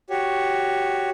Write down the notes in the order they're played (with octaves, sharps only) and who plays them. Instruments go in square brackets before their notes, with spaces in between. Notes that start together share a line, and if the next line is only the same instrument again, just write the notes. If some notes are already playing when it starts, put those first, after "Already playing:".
[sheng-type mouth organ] F#4 G4 C#5